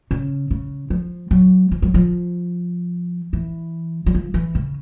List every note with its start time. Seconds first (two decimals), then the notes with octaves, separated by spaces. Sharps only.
0.11 C#3
0.51 C#3
0.90 F3
1.31 F#3
1.72 F3
1.82 F#3
1.94 F3
3.33 E3
4.06 F#3
4.15 F3
4.34 E3
4.55 C#3